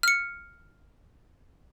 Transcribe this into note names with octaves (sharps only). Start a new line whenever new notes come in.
F6 C#7